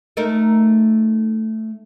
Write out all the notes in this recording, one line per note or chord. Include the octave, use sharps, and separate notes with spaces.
A3 D#4 A#4